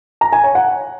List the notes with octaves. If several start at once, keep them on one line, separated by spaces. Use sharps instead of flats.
A#5
G#5
C#5
F#5